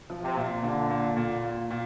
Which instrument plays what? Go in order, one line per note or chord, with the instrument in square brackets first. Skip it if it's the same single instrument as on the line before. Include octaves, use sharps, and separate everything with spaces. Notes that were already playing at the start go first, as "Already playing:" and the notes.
[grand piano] F3
[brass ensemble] C3
[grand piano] A#2
[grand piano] A#2 [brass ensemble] D3
[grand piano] A#2
A#2
A#2
A#2